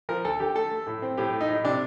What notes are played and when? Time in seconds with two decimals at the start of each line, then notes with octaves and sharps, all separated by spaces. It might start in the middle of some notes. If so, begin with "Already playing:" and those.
0.09 F3 A#4
0.25 D2 A4
0.40 D3 G4
0.56 A3 A4
0.71 A3
0.87 A2
1.02 C4
1.17 A2 G4
1.33 A3
1.41 D#4
1.49 A2
1.64 C3 D4